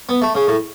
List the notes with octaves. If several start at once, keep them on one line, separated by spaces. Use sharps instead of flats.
B3
A3
C#3
A2